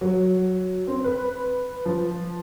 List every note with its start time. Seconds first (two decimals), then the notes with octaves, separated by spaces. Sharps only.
0.01 F#3
0.87 C4
1.04 B4
1.85 F3